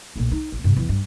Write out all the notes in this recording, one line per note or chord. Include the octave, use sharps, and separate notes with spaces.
B1 A#2
D#4
A1
G2 C3
E2 E3
G2